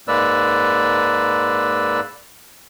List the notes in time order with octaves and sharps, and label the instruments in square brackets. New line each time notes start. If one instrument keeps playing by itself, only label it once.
[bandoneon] G#2 G#3 A#3 B4 D5 E6